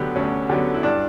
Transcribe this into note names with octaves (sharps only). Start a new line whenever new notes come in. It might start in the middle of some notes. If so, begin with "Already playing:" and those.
Already playing: D2 D3 F#3 B3 G4
D2 C#4
D3 F#3 B3
E4
G2 D4